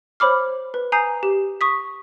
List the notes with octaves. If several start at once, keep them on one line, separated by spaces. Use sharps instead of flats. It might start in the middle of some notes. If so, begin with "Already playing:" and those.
C5 C#5 B5 D6 F6
B4
G#5 A#5 D#6 G6 C7
G4
C#6 D#6 B6